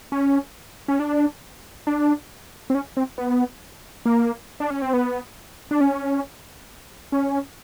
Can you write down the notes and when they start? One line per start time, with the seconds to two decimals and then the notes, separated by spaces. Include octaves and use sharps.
0.12 C#4
0.88 C#4
1.00 D4
1.87 D4
2.70 C4
2.75 C#4
2.97 C4
3.18 B3
4.06 A#3
4.60 D4
4.70 C#4
4.82 C4
4.93 B3
5.71 D4
5.81 C#4
7.12 C#4